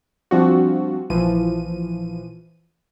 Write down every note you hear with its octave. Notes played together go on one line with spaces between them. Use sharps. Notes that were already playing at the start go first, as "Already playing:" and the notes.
F3 G3 C4 D4 F4 F#4
A#1 E3 F3 D#7